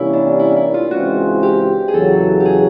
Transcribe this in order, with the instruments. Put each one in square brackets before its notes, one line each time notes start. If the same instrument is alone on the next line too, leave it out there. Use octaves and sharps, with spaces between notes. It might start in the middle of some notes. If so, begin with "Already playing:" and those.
Already playing: [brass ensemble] C3 E3 G3 A#3 C#4 [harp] E4
[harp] D4
E4
E4
F4
[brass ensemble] C#2 C#3 E3 G#3 C4 [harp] F#4
[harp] G4
G#4
[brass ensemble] E2 C#3 F#3 [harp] A4
[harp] G4
G#4